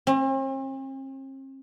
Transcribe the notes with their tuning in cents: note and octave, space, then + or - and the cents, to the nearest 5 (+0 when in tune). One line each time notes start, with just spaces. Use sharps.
C4 +45